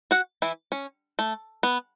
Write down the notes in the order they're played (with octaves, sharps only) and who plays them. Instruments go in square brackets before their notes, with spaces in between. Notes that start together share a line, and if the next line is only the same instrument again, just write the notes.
[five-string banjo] F#4 F#5
E3 E4
C#4
A3
B3